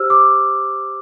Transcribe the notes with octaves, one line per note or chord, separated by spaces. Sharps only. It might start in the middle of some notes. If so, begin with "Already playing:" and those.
Already playing: G4 C5 E6 F6
D6